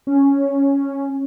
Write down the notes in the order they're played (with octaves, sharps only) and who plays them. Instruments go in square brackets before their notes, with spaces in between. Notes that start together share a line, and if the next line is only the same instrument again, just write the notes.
[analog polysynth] C#4